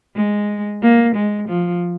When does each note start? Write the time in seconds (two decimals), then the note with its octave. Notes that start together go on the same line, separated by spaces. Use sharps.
0.16 G#3
0.82 A#3
1.16 G#3
1.49 F3